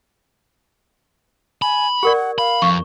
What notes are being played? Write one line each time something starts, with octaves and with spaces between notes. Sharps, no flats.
G#5 B5
G4 A#4 D5 F#5
F5 B5
F2 C#6